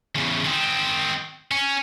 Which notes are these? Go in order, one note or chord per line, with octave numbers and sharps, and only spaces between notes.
E2 C#3
D#3 C4
C#4